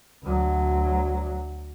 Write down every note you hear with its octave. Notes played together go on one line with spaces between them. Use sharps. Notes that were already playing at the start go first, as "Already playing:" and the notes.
D2 F#3